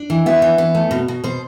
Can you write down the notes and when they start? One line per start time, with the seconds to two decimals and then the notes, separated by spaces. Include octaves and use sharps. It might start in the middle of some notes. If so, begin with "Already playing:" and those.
Already playing: D4
0.10 E3
0.26 B3 E5
0.42 E3
0.58 B3
0.75 A3
0.91 B2
1.08 B2
1.24 B2 C5